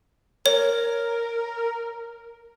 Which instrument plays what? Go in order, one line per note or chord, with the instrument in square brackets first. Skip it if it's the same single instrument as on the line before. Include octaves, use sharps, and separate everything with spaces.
[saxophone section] A#4 [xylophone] C#5